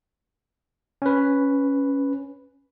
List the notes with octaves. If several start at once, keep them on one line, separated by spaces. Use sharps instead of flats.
C#4 B4